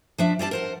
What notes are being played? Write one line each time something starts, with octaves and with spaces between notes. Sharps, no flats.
F3 D4 E5
G3 C4 D5 A5
A#4 C5 F#5